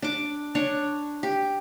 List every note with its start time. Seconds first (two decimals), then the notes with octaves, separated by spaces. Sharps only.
0.02 D4 D6
0.55 D4 C#5
1.23 G4